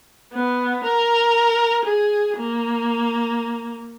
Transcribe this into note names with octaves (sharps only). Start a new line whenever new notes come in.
B3
A#4
G#4
A#3